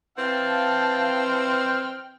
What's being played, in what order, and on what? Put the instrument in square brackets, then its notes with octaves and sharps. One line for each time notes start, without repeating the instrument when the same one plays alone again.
[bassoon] E3 [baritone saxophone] C4 [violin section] F5 A5 [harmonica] G5 F6